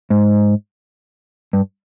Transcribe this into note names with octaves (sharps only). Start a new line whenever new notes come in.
G#2
G2